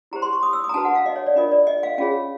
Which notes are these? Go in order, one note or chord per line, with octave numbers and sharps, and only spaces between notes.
E4 G4 C5 A#5
C6
C#6
D#6
E6
D#6
A#5
D4 F#4 B4 A5
F#5
F5
D#5
C#5
D5
D4 F4 A#4 D#5
D5
D#5
F5
C#4 F4 G#4 C#5 F5